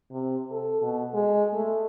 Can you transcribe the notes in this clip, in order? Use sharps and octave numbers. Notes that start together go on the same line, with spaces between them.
C3
A4
B2
G#3
A3